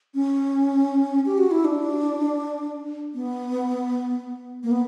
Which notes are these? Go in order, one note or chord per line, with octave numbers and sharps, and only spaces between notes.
C#4
G4
F#4
E4
D4
B3
A#3
B3